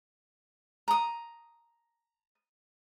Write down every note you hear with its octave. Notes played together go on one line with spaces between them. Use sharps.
A#5 D#6